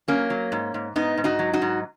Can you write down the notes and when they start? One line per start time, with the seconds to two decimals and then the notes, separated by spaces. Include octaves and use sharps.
0.08 F#3 A#3 C#4
0.30 F#3
0.52 G#2
0.74 G#2
0.96 G#2 B3 D#4
1.17 G#2
1.24 D#4 F#4
1.39 F#3
1.53 D#4 F#4
1.62 G#2